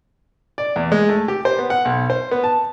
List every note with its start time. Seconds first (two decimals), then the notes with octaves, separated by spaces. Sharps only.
0.58 D5
0.76 E2
0.92 G#3
1.09 A3
1.28 G4
1.45 C5
1.59 B3
1.70 F#5
1.85 B1
2.10 C5
2.31 B3
2.44 A5